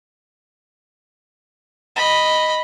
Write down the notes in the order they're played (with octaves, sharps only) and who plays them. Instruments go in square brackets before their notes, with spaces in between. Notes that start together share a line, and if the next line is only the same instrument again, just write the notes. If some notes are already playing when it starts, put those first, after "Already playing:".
[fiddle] D#5 B5